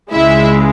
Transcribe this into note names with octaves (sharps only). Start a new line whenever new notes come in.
C#2 C#3 G#3 E4 E5